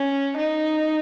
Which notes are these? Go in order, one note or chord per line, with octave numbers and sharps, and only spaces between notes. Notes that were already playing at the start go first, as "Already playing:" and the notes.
Already playing: C#4
D#4